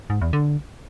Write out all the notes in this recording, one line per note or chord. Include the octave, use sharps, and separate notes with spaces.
G#2
E2
D3